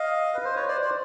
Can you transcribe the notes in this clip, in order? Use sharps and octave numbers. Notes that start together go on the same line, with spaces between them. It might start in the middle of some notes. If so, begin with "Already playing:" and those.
Already playing: D#5 F5
B4
C5
B4 C#5
C5 D5
C5 D5